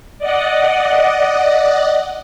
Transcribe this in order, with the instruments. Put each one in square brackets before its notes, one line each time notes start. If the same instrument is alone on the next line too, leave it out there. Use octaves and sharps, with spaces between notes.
[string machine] D5 D#5 F#5